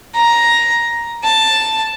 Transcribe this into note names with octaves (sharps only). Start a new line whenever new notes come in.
A#5
A5